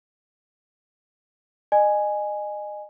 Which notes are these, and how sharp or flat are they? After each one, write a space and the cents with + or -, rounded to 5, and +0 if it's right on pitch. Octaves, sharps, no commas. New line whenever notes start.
D#5 -30 G#5 +0